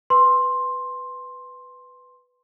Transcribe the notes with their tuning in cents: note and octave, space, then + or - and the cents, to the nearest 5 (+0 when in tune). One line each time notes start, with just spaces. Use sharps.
B4 +5 C6 +10